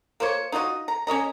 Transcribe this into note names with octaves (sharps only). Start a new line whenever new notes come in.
A#3 F4 C5 C#5
D#4 F4 F#4 D#5
A#5
C#4 C#5 D#5 A#5